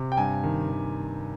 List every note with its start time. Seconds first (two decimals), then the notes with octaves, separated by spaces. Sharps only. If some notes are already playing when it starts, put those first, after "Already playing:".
Already playing: C3
0.12 G5
0.17 G2 G#5
0.43 D#3
0.69 D#3